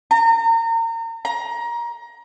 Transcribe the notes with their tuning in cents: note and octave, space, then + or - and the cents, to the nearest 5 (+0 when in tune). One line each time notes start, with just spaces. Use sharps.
A#5 -35
A#5 +25